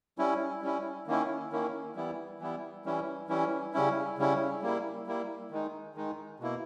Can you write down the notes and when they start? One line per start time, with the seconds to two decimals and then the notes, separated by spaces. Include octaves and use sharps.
0.18 G3 C#4 E4
0.62 G3 C#4 E4
1.07 D#3 A#3 C#4 E4
1.52 D#3 A#3 C#4 E4
1.96 E3 G3 B3 E4
2.39 E3 G3 B3 E4
2.85 E3 G3 C#4 E4
3.28 E3 G3 C#4 E4
3.74 C#3 G3 C#4 E4
4.18 C#3 G3 C#4 E4
4.62 G3 A#3 E4
5.07 G3 A#3 E4
5.51 D#3 G#3 D#4
5.95 D#3 G#3 D#4
6.40 B2 A#3 E4